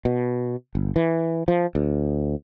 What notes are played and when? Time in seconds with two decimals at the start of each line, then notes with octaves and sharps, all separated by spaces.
0.05 B2
0.75 G1
0.96 E3
1.48 F3
1.75 D2